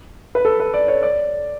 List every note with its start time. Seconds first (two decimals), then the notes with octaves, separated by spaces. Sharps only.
0.35 B4
0.45 A4
0.60 B4
0.74 D5
0.88 C#5
1.03 D5